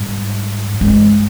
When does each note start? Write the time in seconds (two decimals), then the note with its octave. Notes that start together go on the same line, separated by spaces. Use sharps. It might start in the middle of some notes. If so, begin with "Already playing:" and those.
Already playing: G#2 G3
0.74 G#2
0.81 G2 G#3